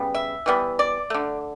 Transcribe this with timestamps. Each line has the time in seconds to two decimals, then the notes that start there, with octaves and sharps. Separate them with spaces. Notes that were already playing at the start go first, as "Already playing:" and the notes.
Already playing: C#3 G3 B3
0.15 E5
0.46 E3 G3 B3
0.79 D5
1.10 D3 A3